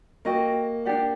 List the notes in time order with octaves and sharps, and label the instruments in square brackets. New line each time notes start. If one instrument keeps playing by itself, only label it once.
[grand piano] A#3 [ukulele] F#4 A4 D#5 G5
[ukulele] D4 G4 D5 F#5